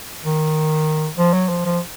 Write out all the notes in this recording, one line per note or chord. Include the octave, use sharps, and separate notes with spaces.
D#3
F3
F#3
F3
F3